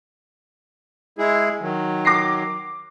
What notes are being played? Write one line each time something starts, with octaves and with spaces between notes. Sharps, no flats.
G#3 E4 G#4
D#3 F#3
D6 A#6 C7